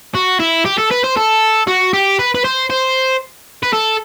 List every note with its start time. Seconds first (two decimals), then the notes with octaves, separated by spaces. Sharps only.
0.15 F#4
0.40 E4
0.66 G4
0.78 A4
0.91 B4
1.04 C5
1.17 A4
1.67 F#4
1.93 G4
2.19 B4
2.35 B4
2.44 C5
2.70 C5
3.63 B4
3.73 A4